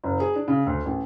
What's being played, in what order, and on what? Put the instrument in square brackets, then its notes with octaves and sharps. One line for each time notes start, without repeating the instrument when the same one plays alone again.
[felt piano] F#1
G#4
D4
C#3
D2
A1